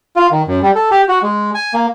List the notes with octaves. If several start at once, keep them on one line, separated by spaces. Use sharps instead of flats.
F4
D#3
F#2
G3
A4
G4
F#4
G#3
G#5
A#3